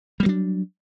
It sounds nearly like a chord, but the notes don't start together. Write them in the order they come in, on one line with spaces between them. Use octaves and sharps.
G3 A#3 F#3 D4